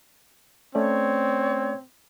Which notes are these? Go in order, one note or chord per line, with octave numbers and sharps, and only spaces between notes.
A3 C4 C#4 C#5 D5